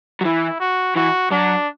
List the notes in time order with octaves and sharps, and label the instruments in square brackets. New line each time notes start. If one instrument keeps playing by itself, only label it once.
[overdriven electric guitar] F#3
[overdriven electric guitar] E3 [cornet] E4
[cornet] F#4
[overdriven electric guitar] E3 [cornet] F#4
[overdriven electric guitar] F#3 [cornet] D4